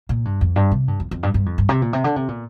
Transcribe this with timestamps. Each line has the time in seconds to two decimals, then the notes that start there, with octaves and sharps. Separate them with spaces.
0.09 A#2
0.25 G2
0.41 F2
0.56 G2
0.71 C3
0.88 G2
1.00 F2
1.11 F2
1.23 G2
1.34 G2
1.46 F2
1.58 G2
1.69 C3
1.82 A#2
1.93 C3
2.04 D3
2.16 C3
2.28 A#2